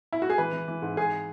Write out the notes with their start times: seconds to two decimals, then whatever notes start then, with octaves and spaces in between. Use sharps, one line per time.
0.12 E4
0.22 F#4
0.30 G#4
0.38 E3 B4
0.52 E3
0.68 E3
0.82 G#2
0.97 G#2 G#4